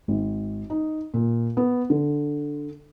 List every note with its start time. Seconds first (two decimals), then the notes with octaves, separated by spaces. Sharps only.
0.08 G#1
0.70 D#4
1.14 A#2
1.57 B3
1.90 D3